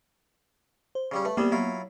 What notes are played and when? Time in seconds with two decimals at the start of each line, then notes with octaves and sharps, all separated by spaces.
0.95 C5
1.12 C#3 G3 C#4
1.25 A3 B4
1.37 C2 G3 A#3 B3 G#4
1.52 F#3 E4 F4